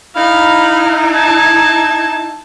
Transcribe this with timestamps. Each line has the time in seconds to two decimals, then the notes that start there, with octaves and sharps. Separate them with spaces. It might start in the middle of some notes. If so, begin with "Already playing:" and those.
0.15 D#4 E4 F5 B5
1.14 A5 G#6